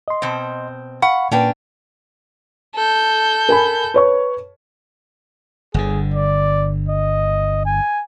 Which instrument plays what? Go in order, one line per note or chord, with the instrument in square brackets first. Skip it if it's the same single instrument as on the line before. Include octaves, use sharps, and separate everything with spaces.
[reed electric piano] D#5 C6
[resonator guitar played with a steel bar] B2 C4
[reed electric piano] F5 B5 C#6 [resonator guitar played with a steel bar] F#5
[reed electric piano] A#2 A#3 B4 [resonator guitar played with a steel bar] C#4 D4 G5
[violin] A4 G6
[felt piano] A#4 G#5 B5
B4 C#5 C#6
[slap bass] G1 D3 [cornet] G#4
[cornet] D5
D#5
G#5